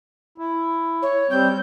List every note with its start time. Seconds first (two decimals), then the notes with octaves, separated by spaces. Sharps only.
0.38 E4
1.02 C#5
1.30 G3 C4 G6